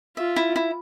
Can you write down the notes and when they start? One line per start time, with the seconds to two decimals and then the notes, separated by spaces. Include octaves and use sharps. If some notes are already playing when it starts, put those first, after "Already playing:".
0.17 F4 E5
0.36 E4
0.56 E4